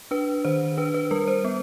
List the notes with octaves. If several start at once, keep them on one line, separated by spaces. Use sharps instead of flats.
D4 B4
D#3 C5
D4 B4
B4
G3 A#4
C5
B3